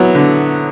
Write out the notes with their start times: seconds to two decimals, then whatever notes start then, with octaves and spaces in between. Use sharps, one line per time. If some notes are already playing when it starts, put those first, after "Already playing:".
Already playing: F#3 B3 E4
0.15 D3